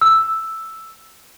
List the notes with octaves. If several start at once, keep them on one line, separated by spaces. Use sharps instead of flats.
E6